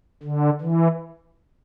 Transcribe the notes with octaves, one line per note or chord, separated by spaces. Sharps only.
D3
E3